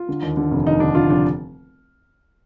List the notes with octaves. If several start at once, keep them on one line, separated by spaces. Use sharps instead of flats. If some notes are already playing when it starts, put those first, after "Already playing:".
Already playing: F4
D3
D#2
D3
F1
D#2 D#4
D3 D4
D3 F4
F1 D4